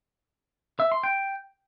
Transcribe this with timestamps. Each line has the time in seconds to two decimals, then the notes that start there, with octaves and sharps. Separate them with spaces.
0.80 E5
0.92 C6
1.04 G5